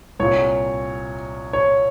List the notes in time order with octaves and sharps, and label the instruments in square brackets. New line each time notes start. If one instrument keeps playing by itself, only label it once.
[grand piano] C2 A#2 C#5
C#5